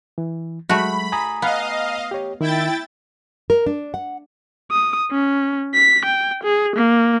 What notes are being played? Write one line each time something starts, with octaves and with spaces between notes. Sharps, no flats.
E3
F#3 G#3 A3 F#4 B5
G#5 A#5 D#6
B3 D#5 F5
G4 C#5
D#3 E4 G5 A6
A#4
D4
F#5
D#6
C#4
B6
G5
G#4
A#3